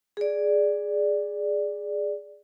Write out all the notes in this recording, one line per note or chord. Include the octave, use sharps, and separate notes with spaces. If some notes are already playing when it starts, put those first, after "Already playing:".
G#4 D5